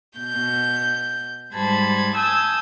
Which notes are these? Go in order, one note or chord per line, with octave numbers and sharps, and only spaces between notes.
B2 G6
G#2 G3 C5 A5 B5 G#6
G#5 A5 D#6 E6 G6 G#6